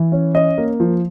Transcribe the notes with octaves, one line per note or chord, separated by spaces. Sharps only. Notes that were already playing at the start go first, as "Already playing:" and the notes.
Already playing: E3
C#4
C#4 D#5
A#3
F3